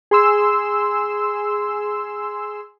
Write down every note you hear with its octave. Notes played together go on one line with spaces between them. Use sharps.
G#4 C6 E6